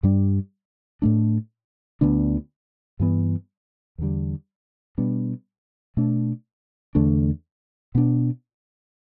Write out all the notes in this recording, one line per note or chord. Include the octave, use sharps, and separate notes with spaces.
G2 G3 D4
A2 A3 D4
D2 D3 B3 D4
G2 E3 B3
E2 D3 G3
B2 G3 B3 D4
B2 A3 D4
E2 D3 A3 D4
B2 B3 D4